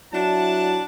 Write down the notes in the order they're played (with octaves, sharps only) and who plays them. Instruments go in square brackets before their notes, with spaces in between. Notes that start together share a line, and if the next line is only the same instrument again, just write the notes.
[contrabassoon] F#3 [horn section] D4 F#5 A5 [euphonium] E4 [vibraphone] D5